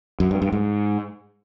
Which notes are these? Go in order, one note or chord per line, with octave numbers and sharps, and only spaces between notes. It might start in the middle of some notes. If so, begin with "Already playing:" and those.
F#2
G2
G2
G#2